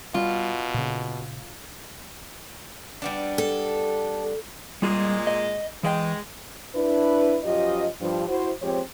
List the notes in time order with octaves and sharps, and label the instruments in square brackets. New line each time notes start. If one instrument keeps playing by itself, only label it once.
[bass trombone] B2 [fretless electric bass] G3 [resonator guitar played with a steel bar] F4
[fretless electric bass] A#2 C#3
[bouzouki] G3 B3 D4
[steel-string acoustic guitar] A4
[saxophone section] A#2 G#3 [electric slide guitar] G3 F4 G#4
[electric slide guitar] D#5
[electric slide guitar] E3 D#5 G5 [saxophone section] G#3
[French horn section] D4 E4 B4
F#2 F3 F4 G4 D#5
G2 F3
E4 F#4 C5
F3 G#3 C4 G4 C5 C#5